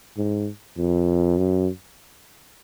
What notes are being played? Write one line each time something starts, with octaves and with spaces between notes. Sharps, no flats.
G#2
F2
F#2